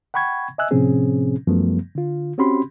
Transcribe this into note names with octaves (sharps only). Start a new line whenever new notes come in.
F#5 G5 B5 C#6 G#6
D#5 E5 G#5 E6 F#6
A2 C3 F3 C4 C#4 G#4
F#2 F3 G3 A3 B3
D3 F4
C4 C#4 F#4 G4 B5 C6